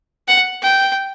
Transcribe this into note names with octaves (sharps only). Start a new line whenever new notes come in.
F#5
G5